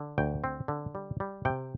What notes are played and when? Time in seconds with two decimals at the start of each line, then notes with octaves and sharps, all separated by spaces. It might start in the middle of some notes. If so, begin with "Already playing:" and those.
Already playing: D3
0.18 D2 G5
0.44 C4
0.68 D3
0.95 G3
1.20 G3
1.45 C3 G5